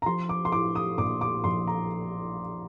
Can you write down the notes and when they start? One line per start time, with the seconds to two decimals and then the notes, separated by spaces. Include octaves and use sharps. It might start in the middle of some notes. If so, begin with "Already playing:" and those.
0.02 A#5
0.06 F3 C6
0.29 D6
0.45 C6
0.52 A2 D6
0.75 D#6
0.98 A#1 D6
1.21 D6
1.44 A#1 C6
1.67 A#5